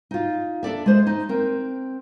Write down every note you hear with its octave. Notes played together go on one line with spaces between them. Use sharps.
D#4 F4
D4 A4 D5 E5
G#3 C5
D#4
C4 A#4